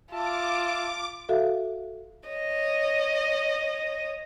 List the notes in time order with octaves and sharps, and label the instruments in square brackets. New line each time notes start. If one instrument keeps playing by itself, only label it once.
[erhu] F4 [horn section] E5 A5 [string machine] D6
[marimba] F#4 A4 E5 F5
[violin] C#5 D#5